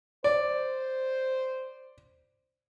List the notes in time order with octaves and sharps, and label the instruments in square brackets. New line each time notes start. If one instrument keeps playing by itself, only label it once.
[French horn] C5 [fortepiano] D5